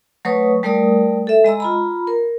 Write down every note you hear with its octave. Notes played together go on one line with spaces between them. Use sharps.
F#3 A3 B4 C#5 C#6 D#6
G3 A3 A#4 D5 D#6
A4 E5
G#3 D#5 A#5 E6
F4 A#5 B5
A#4